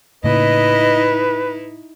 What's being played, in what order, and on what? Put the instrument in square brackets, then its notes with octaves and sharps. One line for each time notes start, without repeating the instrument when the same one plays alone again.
[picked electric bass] A2 C#3 A#3 [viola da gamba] D#4 E4 [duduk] B4 [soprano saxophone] D#5